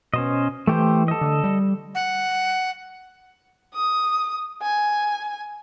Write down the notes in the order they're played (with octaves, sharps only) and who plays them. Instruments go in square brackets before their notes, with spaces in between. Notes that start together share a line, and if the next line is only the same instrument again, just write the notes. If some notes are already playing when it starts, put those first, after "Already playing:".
[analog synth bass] B2 [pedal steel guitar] C#4 C5 D#5
[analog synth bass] E3 [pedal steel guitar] A3 G4 C5
[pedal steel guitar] A4 D#5
[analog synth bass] D3
G3
[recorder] F#5
[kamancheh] D#6
G#5